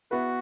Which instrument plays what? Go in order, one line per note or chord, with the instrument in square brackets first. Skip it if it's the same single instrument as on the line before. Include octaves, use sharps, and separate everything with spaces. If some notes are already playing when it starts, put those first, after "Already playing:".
[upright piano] B3 E4 B4 [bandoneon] F#4